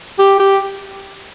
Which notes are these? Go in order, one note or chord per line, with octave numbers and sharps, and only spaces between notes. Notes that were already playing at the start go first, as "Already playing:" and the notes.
G4
G4